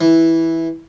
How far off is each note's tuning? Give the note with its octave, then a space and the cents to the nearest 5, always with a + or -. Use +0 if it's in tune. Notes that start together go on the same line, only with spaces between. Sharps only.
E3 -5